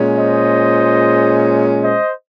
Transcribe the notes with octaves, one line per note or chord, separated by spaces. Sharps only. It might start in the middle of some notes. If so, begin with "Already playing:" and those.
Already playing: A#2 G#3 C#4
C5 D#5
C5 D#5